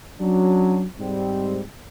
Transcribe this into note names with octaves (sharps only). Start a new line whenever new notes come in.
F#3 C#4 D4
G#2 G3 C4